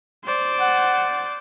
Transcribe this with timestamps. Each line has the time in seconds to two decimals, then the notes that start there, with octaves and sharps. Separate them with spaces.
0.24 C5 D5
0.60 F#5